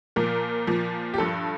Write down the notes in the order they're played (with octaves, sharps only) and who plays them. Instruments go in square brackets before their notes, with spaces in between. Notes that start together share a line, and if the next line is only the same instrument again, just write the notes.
[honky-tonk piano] A#2 F3 A#4
A#2 F3
G4
G2 F3 A4